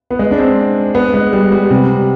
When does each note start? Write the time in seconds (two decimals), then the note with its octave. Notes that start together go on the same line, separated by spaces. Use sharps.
0.11 B3
0.19 G#3
0.31 D4
0.38 C4
0.95 B3
1.14 G#3
1.33 G3
1.52 G3
1.70 C3